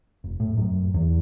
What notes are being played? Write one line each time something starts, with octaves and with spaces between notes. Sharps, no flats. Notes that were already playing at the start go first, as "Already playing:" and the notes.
F1
A2
F#2
E2